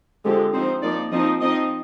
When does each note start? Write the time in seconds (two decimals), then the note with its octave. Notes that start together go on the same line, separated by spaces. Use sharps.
0.25 D3 F3 G#3 C4 G4
0.54 F3 C4 D#4 C5
0.83 F3 A#3 D#4 D5
1.12 F3 C4 D#4 D#5
1.41 F3 C4 D#4 D#5